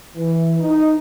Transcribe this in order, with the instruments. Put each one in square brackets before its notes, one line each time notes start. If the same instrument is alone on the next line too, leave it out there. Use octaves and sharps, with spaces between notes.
[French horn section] E3
D#4